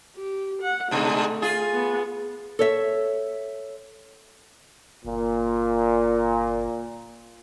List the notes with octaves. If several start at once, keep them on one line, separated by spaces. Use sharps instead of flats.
G4
F#5
G#2 B2 D3 A3
F4 G#4
B3
A4 C#5 E5
G1 A#2